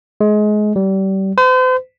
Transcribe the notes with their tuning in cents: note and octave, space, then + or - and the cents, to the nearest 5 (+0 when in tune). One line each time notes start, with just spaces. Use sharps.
G#3 +25
G3 -30
C5 -40